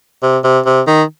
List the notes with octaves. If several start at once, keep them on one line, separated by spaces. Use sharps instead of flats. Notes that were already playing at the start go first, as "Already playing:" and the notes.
C3
C3
C3
D#3